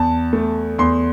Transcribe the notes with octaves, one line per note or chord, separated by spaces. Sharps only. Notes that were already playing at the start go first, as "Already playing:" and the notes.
Already playing: E2 A5
A3
E2 C6